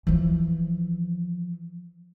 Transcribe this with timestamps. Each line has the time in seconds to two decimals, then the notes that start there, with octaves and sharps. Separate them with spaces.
0.07 E3 F3